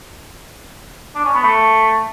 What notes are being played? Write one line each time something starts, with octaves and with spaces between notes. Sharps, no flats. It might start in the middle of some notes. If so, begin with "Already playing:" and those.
D4
C#4
B3
A3